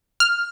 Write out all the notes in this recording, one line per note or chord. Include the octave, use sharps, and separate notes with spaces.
F6